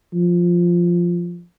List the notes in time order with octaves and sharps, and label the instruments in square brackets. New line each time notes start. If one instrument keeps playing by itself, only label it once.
[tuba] F3